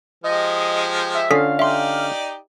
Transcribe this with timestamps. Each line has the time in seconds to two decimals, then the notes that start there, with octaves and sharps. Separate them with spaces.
0.24 F3 G#3 G4 D#5
1.15 E5
1.31 D3 C#4 F4 A4 F5 D#6 B6
1.59 D#4 G4 D5 E5 C6